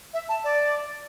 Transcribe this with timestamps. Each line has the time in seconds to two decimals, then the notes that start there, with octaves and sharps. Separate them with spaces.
0.14 E5
0.29 A5
0.44 D5